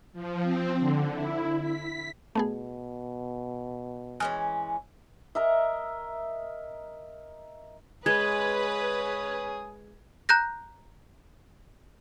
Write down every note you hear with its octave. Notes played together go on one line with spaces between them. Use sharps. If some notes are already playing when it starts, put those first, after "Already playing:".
F3
C4
D3
E4
B6
B2 A3 B3 G#4
E3 G#3 C#4 G#5 D#6 F6
A#4 D#5 E5
G#3 B4 C#5 G#5 D#6 G#6
A#5 F#6 G6 A#6